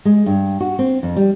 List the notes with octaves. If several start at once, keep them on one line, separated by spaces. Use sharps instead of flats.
G#3
G2
F#4
C4
F2
G3